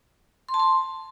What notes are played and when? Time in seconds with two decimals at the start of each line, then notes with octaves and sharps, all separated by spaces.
0.49 C6
0.54 A5
0.59 C6